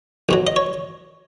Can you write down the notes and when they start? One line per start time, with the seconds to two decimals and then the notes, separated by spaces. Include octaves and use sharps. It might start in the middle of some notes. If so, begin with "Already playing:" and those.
0.29 B1 B2 F#3
0.47 D#5
0.56 C#5